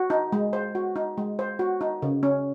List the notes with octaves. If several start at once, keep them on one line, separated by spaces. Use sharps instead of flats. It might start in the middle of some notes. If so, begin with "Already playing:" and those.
Already playing: F#4
D#4
G#3
C5
F#4
D#4
G#3
C5
F#4
D#4
C#3
C#4